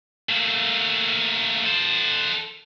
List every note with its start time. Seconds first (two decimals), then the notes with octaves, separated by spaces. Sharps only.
0.29 A3 A#3
1.65 A4 C5